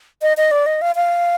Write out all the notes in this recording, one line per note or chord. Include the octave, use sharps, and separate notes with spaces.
D#5
D#5
D5
D#5
F5
F5